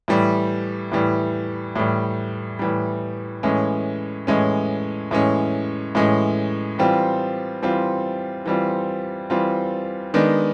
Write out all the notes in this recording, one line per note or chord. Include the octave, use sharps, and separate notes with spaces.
A2 E3 G3
A2 E3 G3
A2 E3 G3
A2 E3 G3
A2 E3 G#3 C#4
A2 E3 G#3 C#4
A2 E3 G#3 C#4
A2 E3 G#3 C#4
E3 G3 C4 F4
E3 G3 C4 F4
E3 G3 C4 F4
E3 G3 C4 F4
D#3 G#3 B3 D4